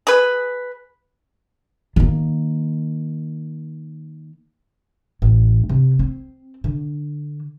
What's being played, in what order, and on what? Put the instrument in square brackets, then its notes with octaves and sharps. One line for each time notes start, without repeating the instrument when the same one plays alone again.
[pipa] G#4 B4
[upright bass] D#3 A#3
A1
C3
C4
D3